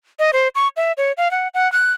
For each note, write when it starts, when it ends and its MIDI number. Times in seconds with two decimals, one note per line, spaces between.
0.19 0.31 75
0.33 0.48 72
0.55 0.68 85
0.77 0.92 76
0.97 1.12 73
1.17 1.31 77
1.31 1.48 78
1.54 1.70 78
1.72 1.92 90